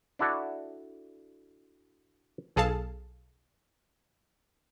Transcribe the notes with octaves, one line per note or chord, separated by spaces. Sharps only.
D4 E4 F#4 A4 D5
B1 G#4 A4 F5 A5